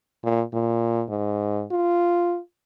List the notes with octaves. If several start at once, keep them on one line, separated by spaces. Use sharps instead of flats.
A#2
A#2
G#2
F4